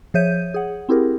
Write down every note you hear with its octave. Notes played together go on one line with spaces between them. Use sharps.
F3 G#4 C#5 E5 G6 D#7
G#4 F#5
C4 E4 G4 G#4 A#4